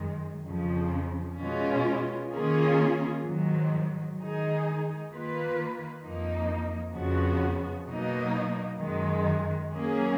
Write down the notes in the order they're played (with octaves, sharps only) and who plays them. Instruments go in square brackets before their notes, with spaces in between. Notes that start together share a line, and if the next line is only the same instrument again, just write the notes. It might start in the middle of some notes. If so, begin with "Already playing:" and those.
Already playing: [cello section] F#2 D#3 G#3
F2 C#3 F3
B2 G#3 C#4 F4
D#3 A#3 C#4 F4 G#4
G#2 D#3 F#3
D#3 G#3 D#4 G#4
D#3 A#3 F4 B4
F2 F3 A#3 D#4
F2 C#3 F3 B3 F#4
B2 F#3 A#3 D#4
F#2 D#3 G#3
F#3 A#3 C#4 G#4